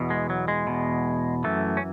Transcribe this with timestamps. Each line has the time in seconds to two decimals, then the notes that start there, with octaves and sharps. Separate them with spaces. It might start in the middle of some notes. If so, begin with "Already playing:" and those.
Already playing: E2 B2
0.10 G#3
0.30 F#3
0.48 G#3
0.67 E2 B2
1.44 F#2 E3 A3
1.77 C#4